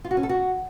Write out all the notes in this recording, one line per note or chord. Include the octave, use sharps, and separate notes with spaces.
F4
F#4
C#4
A4
F#4